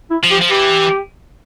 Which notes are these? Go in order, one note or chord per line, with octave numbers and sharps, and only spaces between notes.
E4
F3
G4
F3
E3 G4